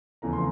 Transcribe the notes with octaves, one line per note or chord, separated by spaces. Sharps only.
E2 C#3 F3 A3 A#5
C6